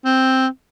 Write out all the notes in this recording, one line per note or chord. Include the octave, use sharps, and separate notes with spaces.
C4